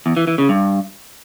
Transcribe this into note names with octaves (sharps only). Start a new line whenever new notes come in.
E2
E3
E3
C#3
G2